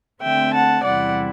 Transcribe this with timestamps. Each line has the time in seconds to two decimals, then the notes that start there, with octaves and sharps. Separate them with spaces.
0.22 D3 A3 C4 E5 G5
0.54 F#5 A5
0.84 E2 C3 G3 C4 E4 D5 F#5